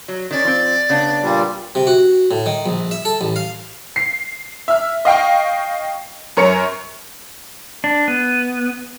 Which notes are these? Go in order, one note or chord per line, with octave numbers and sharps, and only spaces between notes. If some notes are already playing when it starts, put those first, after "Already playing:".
F#3
D#3 C#4 D5
F3 C4
C#3 B3 D4
A#2 G3
C3
F#4
A2
D#3
A#1
E5
A4
A1
F5
C7
E5 F6
D#5 F5 G5 C#6
F#2 A#4 C#5 C#7
D4
B3